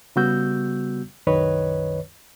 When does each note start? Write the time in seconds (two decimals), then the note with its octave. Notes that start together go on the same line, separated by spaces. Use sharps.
0.16 C#3 G3 B3 F#4 E6 G6
1.27 C2 F#2 D#3 B4 C#5 D#5